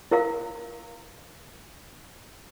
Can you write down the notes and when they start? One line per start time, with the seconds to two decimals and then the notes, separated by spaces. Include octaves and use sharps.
0.11 E4 A#4 F5